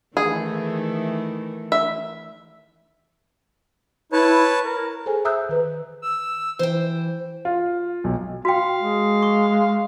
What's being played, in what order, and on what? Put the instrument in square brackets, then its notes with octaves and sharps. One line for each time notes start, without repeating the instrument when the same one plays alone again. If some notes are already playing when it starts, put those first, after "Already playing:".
[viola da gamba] D#3 E3 A3 [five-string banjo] G#4
[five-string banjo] E5
[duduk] E4 [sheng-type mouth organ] B4 C#5 A5
[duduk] A#4
[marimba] G#4 A4 C5 G#5
E5 A#5 D#6 E6 F#6 G6
D#3 B4
[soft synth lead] E6
[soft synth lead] E3 [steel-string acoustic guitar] C5 G5
[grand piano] F4
B1
[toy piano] F#4 G5 [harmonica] F5
[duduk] G#3
[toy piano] C#6